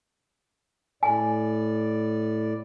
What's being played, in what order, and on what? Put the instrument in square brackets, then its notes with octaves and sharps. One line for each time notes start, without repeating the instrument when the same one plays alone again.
[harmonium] A2 D5 [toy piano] G#5